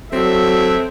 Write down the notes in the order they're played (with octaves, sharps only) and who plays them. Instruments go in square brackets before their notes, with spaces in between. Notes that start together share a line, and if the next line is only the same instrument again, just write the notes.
[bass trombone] F#3 [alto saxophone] C4 [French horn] A4 [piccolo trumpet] E5